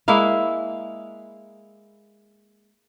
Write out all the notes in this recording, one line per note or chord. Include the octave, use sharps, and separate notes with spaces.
G#3 A#3 E4 F5